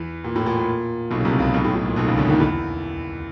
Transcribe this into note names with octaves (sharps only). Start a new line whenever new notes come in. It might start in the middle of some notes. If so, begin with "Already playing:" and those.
Already playing: E2 E3
A#2
A2
A#2
A#2
B1 B2
C#3
C2 C3
C#2 C#3
B1 B2
A2
A2
A#2
B1 B2
C#2 C#3
D2 D3
D#2 D#3
E2 E3